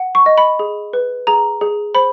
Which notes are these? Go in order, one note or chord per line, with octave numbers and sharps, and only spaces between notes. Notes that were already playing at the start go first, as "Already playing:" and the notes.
Already playing: F#5
C#6
D#5
B5
G#4
B4
G#4 A#5
G#4
C5 B5